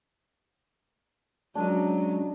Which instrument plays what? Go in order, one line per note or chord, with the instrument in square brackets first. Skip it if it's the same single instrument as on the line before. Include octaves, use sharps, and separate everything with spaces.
[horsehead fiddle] F#3 [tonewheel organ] G#3 C#4 [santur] D4 D#5